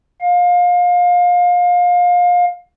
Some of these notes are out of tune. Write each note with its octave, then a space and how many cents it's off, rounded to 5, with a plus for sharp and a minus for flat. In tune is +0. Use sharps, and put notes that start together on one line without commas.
F5 +25